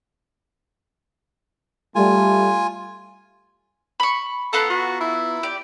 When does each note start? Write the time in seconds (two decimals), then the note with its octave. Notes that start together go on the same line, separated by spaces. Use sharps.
1.95 G3 A3 F4 G#5
4.00 B5 C#6
4.53 B3 F4 A4 A#5
4.70 F#4
5.01 E4
5.43 G4 D5